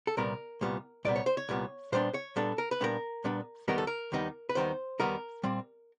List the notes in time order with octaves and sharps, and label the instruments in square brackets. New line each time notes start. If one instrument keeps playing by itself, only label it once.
[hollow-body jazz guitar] A4
C2 A#2 G3 B3 A#4
C2 A#2 G3 B3
C2 A#2 G3 B3 D5
C#5
C5
C#5
C2 A#2 G3 B3
A#2 G3 B3 D4 C5
C#5
A#2 G3 B3 D4 A4
A#4
B4
A#2 G3 B3 D4 A#4
A#2 G3 B3 D4
D#2 D#3 G3 B3 D#4 A#4
A4
A#4
D#2 D#3 G3 B3 D#4
B4
D#2 D#3 G3 B3 D#4 C5
D#2 D#3 G3 B3 D#4 A#4
A#2 G3 C4